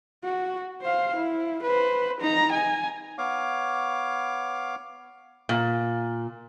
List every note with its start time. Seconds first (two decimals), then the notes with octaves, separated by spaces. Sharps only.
0.24 F#4
0.82 C5 F5
1.16 E4
1.63 B4 C5
2.20 D#4 A#5
2.52 G#5
3.18 B3 C#5 F5 D6
5.49 A#2